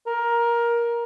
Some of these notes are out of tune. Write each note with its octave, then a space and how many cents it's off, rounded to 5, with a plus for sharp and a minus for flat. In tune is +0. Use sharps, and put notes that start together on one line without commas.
A#4 +15